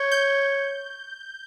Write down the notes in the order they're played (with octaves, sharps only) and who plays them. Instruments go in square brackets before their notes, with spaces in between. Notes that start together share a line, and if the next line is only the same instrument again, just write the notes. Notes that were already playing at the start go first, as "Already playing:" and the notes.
Already playing: [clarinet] C#5 [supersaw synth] G6
[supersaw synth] G6